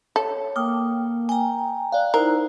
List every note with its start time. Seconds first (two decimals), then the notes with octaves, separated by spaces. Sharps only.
0.16 A4 C#5
0.56 A#3 G5 D6 D#6 F6
1.29 G5 G#5 A#5
1.92 D5 F5 F#6
2.14 D#4 E4 A#4 C5